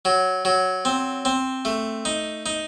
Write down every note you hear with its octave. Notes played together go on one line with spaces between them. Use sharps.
F#3
F#3
C4
C4
A3
D#4
D#4